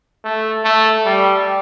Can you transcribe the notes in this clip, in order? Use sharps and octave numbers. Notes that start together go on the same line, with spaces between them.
A3
A3
G3